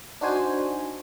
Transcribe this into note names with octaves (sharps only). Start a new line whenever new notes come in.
D4 D#4 F#4 C5 G#5